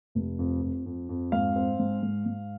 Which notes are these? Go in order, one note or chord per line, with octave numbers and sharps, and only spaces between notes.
F1
F2
F2
F2
F2
G#2 F5
C4
G#2
G#2
G#2